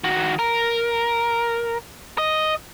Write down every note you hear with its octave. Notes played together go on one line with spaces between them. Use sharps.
D#3 F#4
A#4
D#5